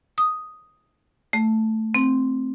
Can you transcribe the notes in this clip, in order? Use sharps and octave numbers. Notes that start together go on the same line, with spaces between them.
D#6
A3
C4